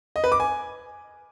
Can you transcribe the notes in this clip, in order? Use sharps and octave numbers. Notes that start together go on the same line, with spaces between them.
D#5
B4
D6
G#5